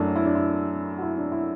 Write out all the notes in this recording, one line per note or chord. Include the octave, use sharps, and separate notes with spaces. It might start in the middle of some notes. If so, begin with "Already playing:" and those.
Already playing: F#2 F#3 A3 D4 E4
E4
D4
E4
F#4
E4
D4
E4